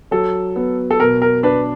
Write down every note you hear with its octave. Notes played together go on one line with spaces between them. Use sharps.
F#3 A4
B3
A4
B2 A#4
A#4
D4 B4